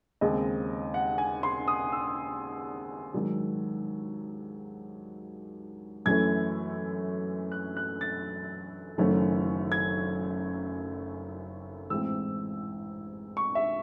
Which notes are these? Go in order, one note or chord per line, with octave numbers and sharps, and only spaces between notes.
D#2 C#3 G#3 C4 D#5
F#5
G#5
C6
D#6
E6
G#2 D#3 F#3
F#2 E3 A3 C#4 G#6
F#6
F#6
A6
F#1 F#2 D#3 A3 C#4
G#6
A1 G#2 E3 C4 E6
C#6
E5